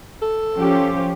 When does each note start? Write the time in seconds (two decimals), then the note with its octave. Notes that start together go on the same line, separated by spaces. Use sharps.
0.22 A4
0.56 F3 C#4 G4